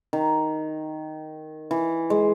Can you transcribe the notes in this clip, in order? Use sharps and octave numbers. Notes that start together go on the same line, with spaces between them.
D#3
E3
G#3